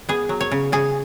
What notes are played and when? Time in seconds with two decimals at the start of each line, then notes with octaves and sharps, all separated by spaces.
0.09 B3 G#4
0.29 F#3
0.41 C#5
0.52 C#3
0.72 C#3 G#4